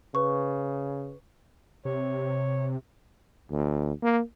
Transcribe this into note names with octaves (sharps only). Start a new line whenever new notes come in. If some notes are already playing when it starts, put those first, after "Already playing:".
C#3 B4 C#6
C3 C#5
D2
A#3